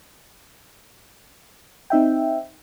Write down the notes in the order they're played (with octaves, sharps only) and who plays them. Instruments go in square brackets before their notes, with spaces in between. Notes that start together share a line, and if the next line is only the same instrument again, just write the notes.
[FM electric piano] C4 D#4 E5 G5